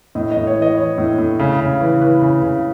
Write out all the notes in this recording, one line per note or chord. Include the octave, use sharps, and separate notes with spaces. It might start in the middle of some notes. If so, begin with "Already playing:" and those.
A2 D#5
D#5
A2
C#5
E3
D#5
E3 C#5
A2
A2
C#3
C#3
E3
E3 B4
C#3
C#3